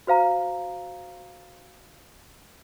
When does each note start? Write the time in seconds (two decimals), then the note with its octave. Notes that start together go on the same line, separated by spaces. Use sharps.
0.07 F#4 C5 F5 A#5